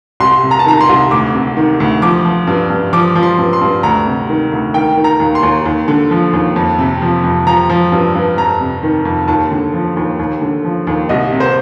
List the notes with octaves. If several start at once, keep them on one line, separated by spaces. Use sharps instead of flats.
C2 C6
C3
A#5
A5
D#3 A#5
C6
C2
D2 D6
C3
D#3
D2
F3 D6
F3
G2
G2
F3 D6
F3
C6
G2
C6
G2
D2 A#5
C3
D#3
D2
D#3 G5
D#3
A#5
D#2
C6
D#2
D#2
D3
F3
D#2
F2
C3
F3
F2
F3 A#5
F3
G2
G2
F2 A#5
C3
D#3
F2
D#2 A5
D3
F3
D#2
D#2
D3
F3
D#2
C2 D#5
C3
C5